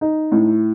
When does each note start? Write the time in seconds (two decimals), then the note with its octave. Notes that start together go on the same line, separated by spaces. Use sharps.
0.01 D#4
0.32 A2